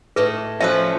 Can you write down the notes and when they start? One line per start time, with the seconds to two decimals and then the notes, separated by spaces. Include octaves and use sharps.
0.16 A2 A3 G#4 B4 D#5
0.61 F3 C#4 A4 B4 E5